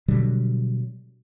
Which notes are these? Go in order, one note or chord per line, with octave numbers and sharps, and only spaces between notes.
B2 D3 F#3 G3